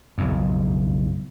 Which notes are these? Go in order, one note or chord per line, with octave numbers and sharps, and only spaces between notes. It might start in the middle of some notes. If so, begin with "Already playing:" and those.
F#1 B1 F2